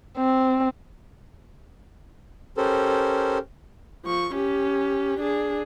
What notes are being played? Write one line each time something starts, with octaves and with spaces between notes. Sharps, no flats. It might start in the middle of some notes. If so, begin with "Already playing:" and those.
C4
C#4 G4 A4 A#4 C5
F3 C#6
C#4 G4
D4 G#4